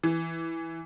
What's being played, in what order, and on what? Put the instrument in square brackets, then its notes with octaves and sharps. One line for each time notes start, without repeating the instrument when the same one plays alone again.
[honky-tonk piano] E3